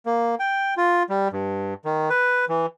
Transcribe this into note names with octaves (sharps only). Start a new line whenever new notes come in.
A#3
G5
F4
G3
G2
D#3
B4
E3